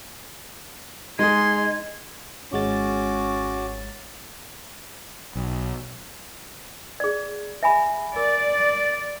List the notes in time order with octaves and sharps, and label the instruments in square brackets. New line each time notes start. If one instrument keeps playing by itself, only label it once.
[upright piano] G#3 G#4 [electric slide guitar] D#4 [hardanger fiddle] C6 [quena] G#6
[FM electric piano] G#1 G#3 A6 [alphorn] C#4 [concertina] F#4 D6
[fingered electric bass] B1
[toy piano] G#4 D5
E5 G#5 B5
[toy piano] A#4 [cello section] D5